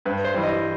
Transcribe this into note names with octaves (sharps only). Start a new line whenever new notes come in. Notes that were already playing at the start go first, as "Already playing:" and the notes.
G2 B4
C5
E3 G3
D#5